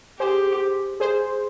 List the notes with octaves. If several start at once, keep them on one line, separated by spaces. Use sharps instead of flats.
G4 G#4 C5
G#4 C5